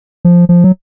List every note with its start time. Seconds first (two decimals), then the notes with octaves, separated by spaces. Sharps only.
0.25 F3
0.49 F3
0.64 F#3